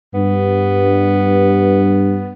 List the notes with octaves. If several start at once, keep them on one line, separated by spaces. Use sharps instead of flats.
G2 B3